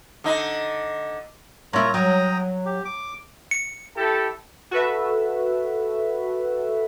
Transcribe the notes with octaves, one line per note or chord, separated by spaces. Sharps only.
D3 D#4
A#2 E4 F4 C#5 A#5
F#3 G5 A#5 D#6
G4
D6
C#7
E4 G4 A4
F#4 A4 B4 E5